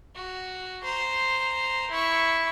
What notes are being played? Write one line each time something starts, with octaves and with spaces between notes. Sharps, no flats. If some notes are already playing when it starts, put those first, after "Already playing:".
F#4
C5 A#5
E4 C#6